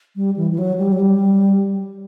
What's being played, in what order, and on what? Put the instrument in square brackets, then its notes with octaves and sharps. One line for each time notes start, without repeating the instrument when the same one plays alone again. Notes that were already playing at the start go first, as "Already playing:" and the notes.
[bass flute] G3
E3
E3
F#3
G3
F#3
G3